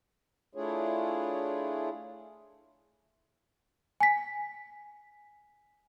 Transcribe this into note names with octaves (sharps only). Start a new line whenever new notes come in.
A3 D4 E4 F4 G#4 C#5
G#5 B6